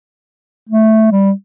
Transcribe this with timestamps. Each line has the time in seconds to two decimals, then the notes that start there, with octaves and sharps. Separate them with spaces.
0.69 A3
1.12 G3